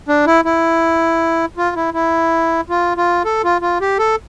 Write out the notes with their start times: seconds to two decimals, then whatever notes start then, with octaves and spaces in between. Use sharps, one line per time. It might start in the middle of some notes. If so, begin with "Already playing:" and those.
0.09 D4
0.27 E4
0.45 E4
1.57 F4
1.76 E4
1.94 E4
2.69 F4
2.97 F4
3.25 A4
3.44 F4
3.62 F4
3.81 G4
3.99 A4